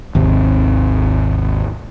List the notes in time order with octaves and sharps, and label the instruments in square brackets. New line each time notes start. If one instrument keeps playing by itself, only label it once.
[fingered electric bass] G#1 D#2 C3